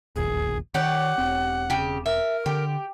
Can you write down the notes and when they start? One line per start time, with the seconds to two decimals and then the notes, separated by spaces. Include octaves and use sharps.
0.16 E1 A#1 D#2 G#4
0.74 D#3 G4 C#5 D5 F#5
1.18 E1 C4
1.70 C#3 G4
2.06 A#4 E5
2.46 D3 G4